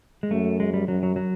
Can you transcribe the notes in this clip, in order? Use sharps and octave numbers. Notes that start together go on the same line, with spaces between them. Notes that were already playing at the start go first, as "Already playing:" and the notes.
G#3
F#2 A3
G#3
G3
F#2 F#3
F#3
F#3